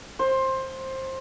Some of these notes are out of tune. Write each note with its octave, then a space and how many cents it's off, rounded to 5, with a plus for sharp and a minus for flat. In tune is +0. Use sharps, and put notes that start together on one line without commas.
C5 +15